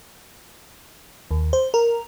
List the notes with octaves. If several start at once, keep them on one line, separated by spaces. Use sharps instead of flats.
D#2
C5
A#4